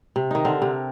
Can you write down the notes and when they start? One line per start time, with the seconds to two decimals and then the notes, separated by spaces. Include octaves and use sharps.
0.16 C3
0.31 D#3 D#4
0.45 D3 C4 A#4
0.62 C3